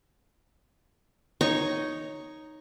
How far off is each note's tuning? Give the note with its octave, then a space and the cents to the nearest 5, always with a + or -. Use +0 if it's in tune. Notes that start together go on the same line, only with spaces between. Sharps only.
D#4 +0 C#5 +0 C#6 +0